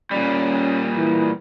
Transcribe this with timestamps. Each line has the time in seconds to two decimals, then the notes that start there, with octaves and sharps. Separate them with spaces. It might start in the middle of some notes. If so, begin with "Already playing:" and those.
0.11 A#2 G3 C#4
0.96 E3